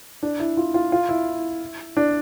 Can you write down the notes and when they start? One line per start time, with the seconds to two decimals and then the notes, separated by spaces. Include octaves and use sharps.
0.23 D4
0.39 E4
0.57 F4
0.74 F4
0.92 F4
1.09 E4
1.97 D4